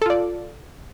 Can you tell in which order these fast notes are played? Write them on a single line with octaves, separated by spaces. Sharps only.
A4 F4 D5